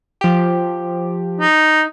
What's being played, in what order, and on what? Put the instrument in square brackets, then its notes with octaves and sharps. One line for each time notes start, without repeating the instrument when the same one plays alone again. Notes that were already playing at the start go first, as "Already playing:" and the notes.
[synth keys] F3 G4
[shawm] D#4